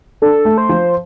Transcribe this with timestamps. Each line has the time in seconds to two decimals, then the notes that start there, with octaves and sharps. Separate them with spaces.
0.22 D4 A4
0.45 A3
0.58 C5
0.69 F3